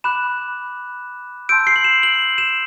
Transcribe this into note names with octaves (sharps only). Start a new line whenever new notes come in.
B5 D6 F#6 E7
A5 C6 E6 G6 D7
C7
F#7
E7
F#7
E7